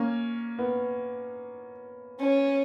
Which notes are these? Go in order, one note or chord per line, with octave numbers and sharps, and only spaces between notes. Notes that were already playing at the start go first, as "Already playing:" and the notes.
Already playing: A#3 C#4
B3
C#4